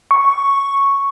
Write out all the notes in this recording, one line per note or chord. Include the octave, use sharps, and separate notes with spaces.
C#6